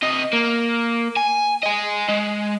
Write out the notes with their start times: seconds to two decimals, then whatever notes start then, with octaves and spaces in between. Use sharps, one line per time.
0.02 C3 D#5
0.33 A#3
1.16 G#5
1.63 D#5 G#5
2.09 G#3